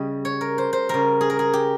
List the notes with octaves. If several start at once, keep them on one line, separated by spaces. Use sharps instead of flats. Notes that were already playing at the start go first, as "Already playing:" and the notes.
Already playing: C#3 G3 D#5
C#5
A#4
C5
C5
C#3 G3 A#4
G#4
A#4
G#4
G4